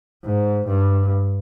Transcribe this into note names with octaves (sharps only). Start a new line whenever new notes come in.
G#2
G2